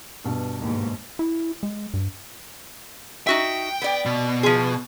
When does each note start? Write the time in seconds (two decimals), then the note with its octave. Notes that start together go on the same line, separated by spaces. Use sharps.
0.24 G2 B2
0.61 D#2 G#2
1.19 E4
1.63 G#3
1.94 G2
3.27 D#4 F#4 E5 G5
3.82 B3 D5
4.05 B2
4.43 F3 G#4